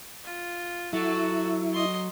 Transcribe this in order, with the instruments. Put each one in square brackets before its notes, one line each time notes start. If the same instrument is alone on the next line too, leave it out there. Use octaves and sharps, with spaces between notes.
[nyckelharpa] F4
[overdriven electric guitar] F#3 [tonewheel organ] E4 [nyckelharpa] F#4 A4
[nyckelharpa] D#5 C6